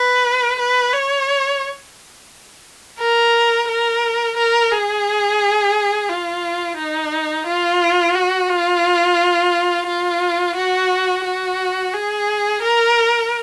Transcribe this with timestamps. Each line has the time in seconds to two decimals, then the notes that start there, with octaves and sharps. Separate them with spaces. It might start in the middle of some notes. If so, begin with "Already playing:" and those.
Already playing: B4
0.59 B4
0.93 C#5
3.00 A#4
3.69 A#4
4.37 A#4
4.71 G#4
6.09 F4
6.78 D#4
7.47 F4
8.15 F#4
8.50 F4
9.87 F4
10.56 F#4
11.25 F#4
11.94 G#4
12.62 A#4